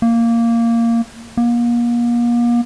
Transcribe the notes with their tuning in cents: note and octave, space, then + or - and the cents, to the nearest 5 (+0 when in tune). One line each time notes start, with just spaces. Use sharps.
A#3 -10
A#3 +35